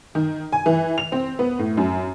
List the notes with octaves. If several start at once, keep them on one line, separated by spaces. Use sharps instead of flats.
D#3
G#5
E3
F7
C4
B3
A2
F#2